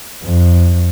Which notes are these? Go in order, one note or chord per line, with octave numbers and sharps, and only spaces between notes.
F2